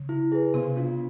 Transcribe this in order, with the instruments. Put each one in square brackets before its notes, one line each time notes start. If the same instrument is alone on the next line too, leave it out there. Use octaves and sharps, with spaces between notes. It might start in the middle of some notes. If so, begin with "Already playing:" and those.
Already playing: [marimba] C#3
[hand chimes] E4
G#4 B4
[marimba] C3 [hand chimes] B3
[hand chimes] D4 F4